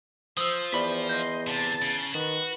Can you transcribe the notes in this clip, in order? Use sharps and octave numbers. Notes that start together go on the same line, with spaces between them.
F3 C5 D#6 E6
E2 D5 B5 B6
D#5 C6 G6
C3 A5 A6
C#3
D#3 F#4 B4